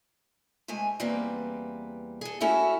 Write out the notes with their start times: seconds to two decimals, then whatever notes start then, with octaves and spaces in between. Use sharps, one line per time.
0.68 C3 G#3 A3 G#5
1.00 E2 G3 A#3 C4 B4
2.21 G#4 A4
2.40 A3 C#4 E4 F#4 A4 E5